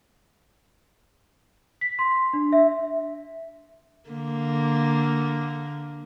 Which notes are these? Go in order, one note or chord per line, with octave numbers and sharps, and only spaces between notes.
B6
C6
D4
E5
D3 A#3